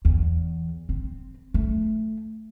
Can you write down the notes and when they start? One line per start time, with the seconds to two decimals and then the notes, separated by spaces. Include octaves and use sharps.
0.05 E2
0.89 C4
1.54 A3